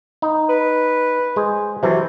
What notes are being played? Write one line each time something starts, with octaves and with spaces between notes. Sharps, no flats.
D#4
B4
G#3 G#4 C5
C3 E3 F#3 A4